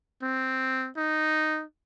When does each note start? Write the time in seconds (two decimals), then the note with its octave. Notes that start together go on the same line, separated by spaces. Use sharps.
0.22 C4
0.97 D#4